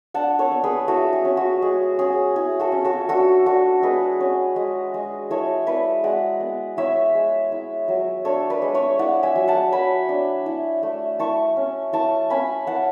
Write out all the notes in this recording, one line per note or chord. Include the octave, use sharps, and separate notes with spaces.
D4 F#5 A5
A4 C#5
B3
G#4 B4
E4 F#4 A4
G#4
C#4
F#4
G#3 G#4
C#4 G#4
E4 G#4
F#4 A4
C#4
F#4 A4
D4 F#4 A4
D4 F#4 A4
G#3 G#4 B4
C#4
G#3
G#3
E4 A4 C#5
E4 B4 D5
G#3 D5 F#5
B3
E4 C#5 E5
G#3
E4
F#3
D4 A4 C#5
B4 D5
G#3
C#5 E5
E4 D5 F#5
E5 G#5
F#3
F#5 A5
F#3 G#5 B5
D4
E4
A3
E4 A5 C#6
C#4
E4 A5 C#6
C#4 G#5 B5
E4 F#5 A5